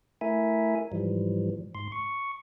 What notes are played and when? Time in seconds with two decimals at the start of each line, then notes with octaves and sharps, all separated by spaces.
0.21 A3 E4 A#4 E5 G#5
0.92 G#2 E3 F3 G3
1.75 G#2 C6
1.92 C#6